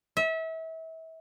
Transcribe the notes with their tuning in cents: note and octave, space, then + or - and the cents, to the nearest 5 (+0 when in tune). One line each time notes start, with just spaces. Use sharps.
E5 -30